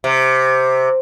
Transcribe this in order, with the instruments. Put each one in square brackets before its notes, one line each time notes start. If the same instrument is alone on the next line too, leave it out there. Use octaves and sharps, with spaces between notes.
[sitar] C3